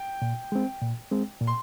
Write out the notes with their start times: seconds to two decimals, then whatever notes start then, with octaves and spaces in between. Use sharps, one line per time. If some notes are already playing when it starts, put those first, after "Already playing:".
Already playing: G5
0.22 A#2
0.52 G#3 C4
0.82 A#2
1.12 G#3 C4
1.41 A#2
1.47 C6